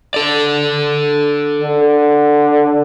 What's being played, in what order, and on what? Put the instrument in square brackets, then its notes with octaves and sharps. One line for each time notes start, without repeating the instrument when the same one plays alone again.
[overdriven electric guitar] A4 D5
[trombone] D3